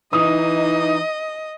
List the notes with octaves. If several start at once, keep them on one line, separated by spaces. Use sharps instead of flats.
E3 D#4 D#5 D#6